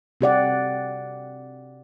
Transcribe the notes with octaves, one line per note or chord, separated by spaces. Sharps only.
C3 G4 D5 F#5